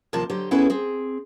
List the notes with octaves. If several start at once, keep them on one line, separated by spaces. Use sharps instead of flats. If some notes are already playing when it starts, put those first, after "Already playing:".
D#2 C3 F3 A#4 A5
D3 F#3 G4 C5
B3 C#4 E4 G#4 A4 B4
C4 G#4